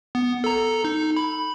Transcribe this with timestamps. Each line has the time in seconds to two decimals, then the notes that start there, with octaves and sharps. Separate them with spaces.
0.15 B3
0.44 A4 A#5
0.84 D#4
1.17 B5